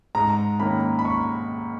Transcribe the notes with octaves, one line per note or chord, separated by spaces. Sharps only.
G#2 A#5
D#3 A#3 C#4 B5
B5
C#6